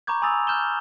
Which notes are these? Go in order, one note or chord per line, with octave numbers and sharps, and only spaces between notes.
A#5 B5 C#6 D6 G6 G#6
G#5 B5 D#6 E6 A6 F7
F6 G6 E7 G7